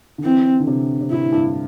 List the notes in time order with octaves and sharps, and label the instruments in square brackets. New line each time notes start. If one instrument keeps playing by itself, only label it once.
[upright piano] D3
[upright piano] E3 [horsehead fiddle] C4
[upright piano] D3
C3
C3
[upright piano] A2 [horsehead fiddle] E4
[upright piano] G2